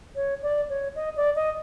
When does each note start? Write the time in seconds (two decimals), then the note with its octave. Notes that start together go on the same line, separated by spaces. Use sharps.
0.16 C#5
0.43 D5
0.69 C#5
0.95 D#5
1.16 D5
1.36 D#5